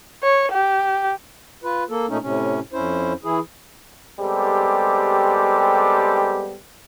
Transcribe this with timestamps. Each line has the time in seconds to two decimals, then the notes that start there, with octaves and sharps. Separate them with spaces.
0.23 C#5
0.52 G4
1.64 F4 B4
1.90 A#3 A4
2.09 A#2 A3 C#4 D#4
2.22 A2 C3 C#4
2.73 F2 C#4 E4 C5
3.24 E3 E4 G#4
4.20 G3 G#3 B3 C4 G4 A4